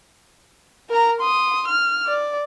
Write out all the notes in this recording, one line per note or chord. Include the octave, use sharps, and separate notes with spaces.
A#4 A#5
C6 D#6
F6
D5